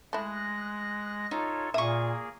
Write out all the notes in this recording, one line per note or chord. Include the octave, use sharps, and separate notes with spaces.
G#3 A3 E4 F#6 A#6
D#4 F4 A4 C#5
A#2 A#3 G#4 E5 C#6 D#6